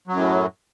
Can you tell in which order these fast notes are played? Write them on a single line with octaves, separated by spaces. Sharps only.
F#3 F#2 A2